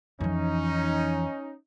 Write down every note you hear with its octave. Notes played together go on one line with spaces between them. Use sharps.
F2 E3 C#4 D#4